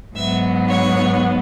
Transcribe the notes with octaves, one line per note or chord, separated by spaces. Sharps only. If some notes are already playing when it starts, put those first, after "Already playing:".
G#2 F#3 B3 E5
C#5